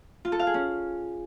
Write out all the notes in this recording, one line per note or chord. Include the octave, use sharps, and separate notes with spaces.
F4
A4
F5
G#4
C#4